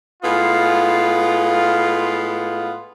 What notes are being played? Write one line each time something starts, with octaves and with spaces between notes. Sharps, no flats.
A2 G#3 B3 F4